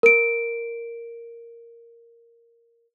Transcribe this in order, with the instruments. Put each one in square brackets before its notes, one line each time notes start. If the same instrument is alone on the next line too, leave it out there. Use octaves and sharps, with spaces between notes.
[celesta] A#4 D7